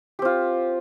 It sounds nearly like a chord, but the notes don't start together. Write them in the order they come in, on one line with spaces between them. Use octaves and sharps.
G4 C4 F4